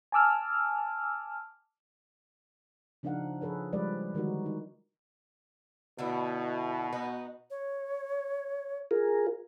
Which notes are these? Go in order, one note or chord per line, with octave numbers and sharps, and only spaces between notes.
G#5 A5 D6 E6 F6
C#3 F3 D4 D#4 F5 F#5
F3 G#4 A4 B4 C#5
F3 G3 G#3 B4 D5
D3 D#3 G3 G#3 D#4 F#4
D#4
B2 D3 A3 E4
B3 D#4 F#4
C#5
F4 G#4 A#4